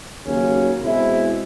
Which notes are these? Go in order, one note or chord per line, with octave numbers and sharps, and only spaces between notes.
D#2 C#3 F#3 A#3 C#4
B2 G#3 C4 E4